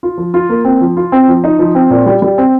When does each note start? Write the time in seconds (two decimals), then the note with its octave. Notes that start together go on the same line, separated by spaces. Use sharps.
0.03 F4
0.18 F3
0.34 F4
0.49 A#3
0.65 C4
0.81 F3
0.97 F4
1.12 C4
1.28 F3
1.44 D#4
1.59 F3
1.75 C4
1.91 A#2
2.06 G3
2.22 G3
2.38 C4